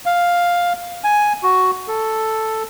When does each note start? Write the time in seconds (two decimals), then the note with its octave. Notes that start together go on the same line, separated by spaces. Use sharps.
0.06 F5
1.04 G#5
1.43 F#4
1.88 A4